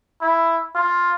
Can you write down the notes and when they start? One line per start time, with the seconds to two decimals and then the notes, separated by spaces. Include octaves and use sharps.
0.21 E4
0.75 F4